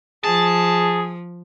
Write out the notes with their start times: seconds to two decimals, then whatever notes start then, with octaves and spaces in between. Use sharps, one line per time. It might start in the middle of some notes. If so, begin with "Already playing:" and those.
0.24 F3 G#4 A5